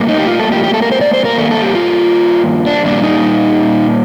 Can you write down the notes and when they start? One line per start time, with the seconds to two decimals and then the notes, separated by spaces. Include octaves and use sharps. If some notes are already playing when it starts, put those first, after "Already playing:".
Already playing: A2 G3 A#3
0.08 D#4
0.19 G4
0.28 F4
0.39 A4
0.52 G4
0.64 G4
0.74 A4
0.82 A#4
0.92 C5
1.01 D5
1.13 C5
1.25 A#4
1.38 G2 D#3 A#3 A4
1.51 A4
1.62 G4
1.75 F4
2.66 D4
2.85 A#2 G3 A#3 D4
3.03 D#4